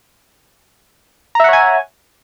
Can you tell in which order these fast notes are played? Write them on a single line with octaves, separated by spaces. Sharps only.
A#5 E5 F#5 C#5 G#5